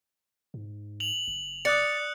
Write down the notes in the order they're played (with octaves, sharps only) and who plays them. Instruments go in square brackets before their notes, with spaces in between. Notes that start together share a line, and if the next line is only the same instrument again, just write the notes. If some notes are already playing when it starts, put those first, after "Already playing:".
[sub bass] G#2
[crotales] F7 F#7
[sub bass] F#1
[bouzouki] D5 [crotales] D#6 F#6 C#7